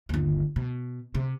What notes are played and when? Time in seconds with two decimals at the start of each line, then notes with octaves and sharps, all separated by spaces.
0.09 G1 D#2
0.56 B2
1.15 C3